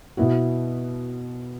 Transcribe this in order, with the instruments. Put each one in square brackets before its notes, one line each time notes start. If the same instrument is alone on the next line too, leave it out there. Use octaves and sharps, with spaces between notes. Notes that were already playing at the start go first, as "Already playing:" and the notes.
[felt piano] B2 B3 F#4 [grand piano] E4